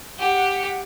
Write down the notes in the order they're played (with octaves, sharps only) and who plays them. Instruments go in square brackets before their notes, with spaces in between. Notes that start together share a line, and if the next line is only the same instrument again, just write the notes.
[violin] G4 [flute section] F#5